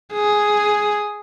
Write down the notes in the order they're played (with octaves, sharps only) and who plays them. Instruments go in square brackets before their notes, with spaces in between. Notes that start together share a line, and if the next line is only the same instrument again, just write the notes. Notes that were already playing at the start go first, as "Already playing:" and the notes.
[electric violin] G#4